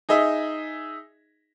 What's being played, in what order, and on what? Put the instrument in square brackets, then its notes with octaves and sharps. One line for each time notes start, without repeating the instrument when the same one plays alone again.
[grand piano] D#4 G#4 D#5 E5